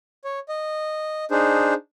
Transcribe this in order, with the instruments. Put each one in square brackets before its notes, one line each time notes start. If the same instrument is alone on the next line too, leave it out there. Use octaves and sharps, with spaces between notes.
[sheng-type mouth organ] C#5
D#5
D4 D#4 G#4 C5